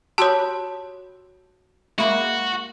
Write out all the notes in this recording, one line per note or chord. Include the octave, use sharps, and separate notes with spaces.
F#4 G4 C#5 A5 B5 C6 D#6 F#6
G#3 A#3 F#4 E5 B5